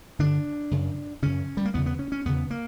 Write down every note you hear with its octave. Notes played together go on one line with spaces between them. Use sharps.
G2 D3 D4
F#2 C#3
F#2 C#3 C#4
G3
A#3
E2 C#3 B3
B3
C#4
C#4
E2 C#3 B3
A#3